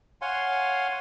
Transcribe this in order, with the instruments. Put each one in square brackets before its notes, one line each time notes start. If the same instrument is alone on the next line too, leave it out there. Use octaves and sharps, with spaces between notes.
[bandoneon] C#5 F5 F#5 G#5 C6